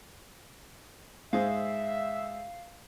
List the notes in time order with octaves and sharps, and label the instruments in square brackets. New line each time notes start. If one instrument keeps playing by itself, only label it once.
[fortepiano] G#2 G#4 C5 [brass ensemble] E5 [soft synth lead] F5